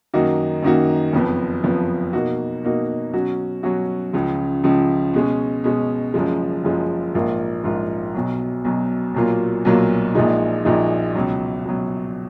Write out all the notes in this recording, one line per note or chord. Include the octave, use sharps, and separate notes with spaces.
F#2 D#3 A#3 D#4 F#4
F#2 D#3 A#3 D#4 F#4
F#1 F2 F3 B3
F#1 F2 F3 B3
B2 A#3 D#4 F#4
B2 A#3 D#4 F#4
B2 F#3 C#4 F#4
B2 F#3 C#4 F#4
C#2 C#3 F3
C#2 C#3 F3
B2 G#3 C#4
B2 G#3 C#4
F#1 F#2 F3 G#3
F#1 F#2 F3 G#3
A#1 G#2 F3 A#3 F4
A#1 G#2 F3 A#3 F4
B1 B2 F#3
B1 B2 F#3
B1 A#2 F#3 A#3 F4
B1 A#2 F#3 A#3 F4
A#1 A#2 F3 G#3 D#4
A#1 A#2 F3 G#3 D#4
C#2 B2 F#3
C#2 B2 F#3